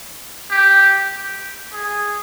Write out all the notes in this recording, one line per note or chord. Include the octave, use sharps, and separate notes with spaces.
G4
G#4